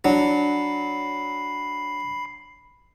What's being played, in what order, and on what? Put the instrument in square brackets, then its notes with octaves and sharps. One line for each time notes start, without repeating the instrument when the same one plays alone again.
[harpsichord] F#3 [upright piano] D4 [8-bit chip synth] B5 C7